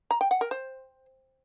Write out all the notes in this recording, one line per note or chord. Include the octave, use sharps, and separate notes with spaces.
A#5
G5
F#5
A#4
C5